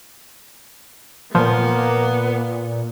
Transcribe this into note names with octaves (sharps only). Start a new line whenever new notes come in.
A#2 F3 A#3 B3